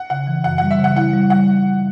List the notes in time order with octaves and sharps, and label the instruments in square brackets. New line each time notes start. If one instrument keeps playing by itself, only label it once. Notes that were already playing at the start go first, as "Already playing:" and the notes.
Already playing: [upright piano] F#5
[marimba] C#3 [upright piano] F#5
[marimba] E3
[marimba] F#2 [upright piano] F#5
[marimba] G3 [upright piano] F#5
[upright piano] E5
[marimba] C#3 [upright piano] F#5
[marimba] E4 [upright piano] F#5
[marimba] G3
[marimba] G3 [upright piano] F#5